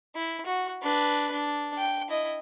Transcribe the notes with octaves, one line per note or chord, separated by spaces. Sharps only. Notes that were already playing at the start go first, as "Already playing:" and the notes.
E4
F#4
D4 B4
D4
G5
E4 D#5